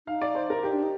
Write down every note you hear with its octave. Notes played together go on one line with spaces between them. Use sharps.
D#4 F5
D5
C5
A#4
D#4 G4
D4
D#4